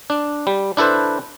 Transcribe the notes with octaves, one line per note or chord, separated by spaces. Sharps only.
D4
G3
D4 E4 A4 B4 C5